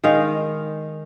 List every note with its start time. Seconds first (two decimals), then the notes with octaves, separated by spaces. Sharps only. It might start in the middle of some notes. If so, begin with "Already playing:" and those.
0.04 D#3 G#3 D#5 F5